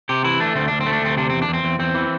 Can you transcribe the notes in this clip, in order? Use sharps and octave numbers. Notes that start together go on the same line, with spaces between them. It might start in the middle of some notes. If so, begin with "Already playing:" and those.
C3 G4
E3 E4
A3 D4
D2 C4
D2 D4
C4
A3
D4
D2 C4
C3 D4
E2 C4
D4
E2 C4
E2
E2 C4
E3